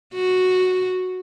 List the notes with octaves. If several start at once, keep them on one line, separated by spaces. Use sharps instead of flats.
F#4